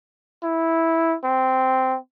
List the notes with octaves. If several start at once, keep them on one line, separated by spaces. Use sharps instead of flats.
E4
C4